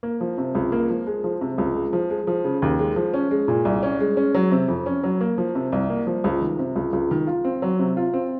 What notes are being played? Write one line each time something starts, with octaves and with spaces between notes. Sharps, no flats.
A#3
F3
C3
C#2
A#3
F3
G#3
F3
C3
C#2
G#3
F3
G#3
F3
C#3
D#2
G#3
F3
C#4
G#3
A#2
C2
C#4
G#3
C#4
F#3
C3
F2
C#4
F#3
A#3
F3
C3
C2
A#3
F3
C#2
D#3
C3
C#2
C#2
D#3
F4
C4
F#3
C3
F4
C4